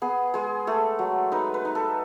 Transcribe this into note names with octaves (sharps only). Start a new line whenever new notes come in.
B3 G#4
G#3 G#4
A3 A4
F#3
D#4 B4
B4
D#4
A4